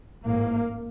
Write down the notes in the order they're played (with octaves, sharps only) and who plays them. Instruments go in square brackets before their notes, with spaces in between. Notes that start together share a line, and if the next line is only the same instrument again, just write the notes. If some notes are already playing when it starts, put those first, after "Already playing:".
[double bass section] A1 G#2 A#3